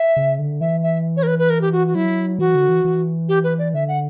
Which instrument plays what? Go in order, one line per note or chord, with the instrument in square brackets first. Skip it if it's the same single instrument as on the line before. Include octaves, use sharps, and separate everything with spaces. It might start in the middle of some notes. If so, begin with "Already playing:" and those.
Already playing: [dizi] E5
[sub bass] C#3
D3
[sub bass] E3 [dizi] E5
[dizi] E5
C#5
A#4
B4
B4
A#4
G4
F#4
F#4
[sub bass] F#3 [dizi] E4
[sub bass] E3 [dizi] F#4
[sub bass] D3
E3
E3
[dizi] G4
B4
D5
[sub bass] D3 [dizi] E5
[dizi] F#5